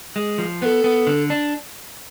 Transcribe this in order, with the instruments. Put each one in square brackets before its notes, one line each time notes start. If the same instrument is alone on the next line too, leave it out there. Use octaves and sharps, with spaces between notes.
[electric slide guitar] G#3
F3
[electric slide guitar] B3 [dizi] A4 B4
[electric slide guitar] B3
D3
D4